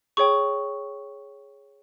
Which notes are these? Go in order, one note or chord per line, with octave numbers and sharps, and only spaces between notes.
G#4 C#5 G5 C#6